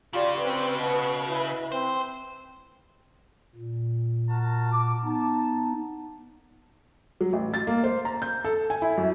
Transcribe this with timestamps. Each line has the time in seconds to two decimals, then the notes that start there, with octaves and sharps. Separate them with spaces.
0.13 C#3 F4 G4 D5
0.43 C4 B4
0.75 B2
1.28 E4
1.72 C4 C5
3.56 A#2
4.29 F#4 A#4 A5
4.72 D6
5.04 B3 D#4 A5
7.21 F#3
7.33 A1
7.54 A6
7.67 A#3
7.84 C5
8.05 A#5
8.22 G6
8.44 A4
8.70 G#5
8.82 E4
8.97 F#2